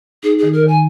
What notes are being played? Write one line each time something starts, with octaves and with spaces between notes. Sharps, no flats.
D#4 G#4
D#3 G#4
A#4
D#3 G#5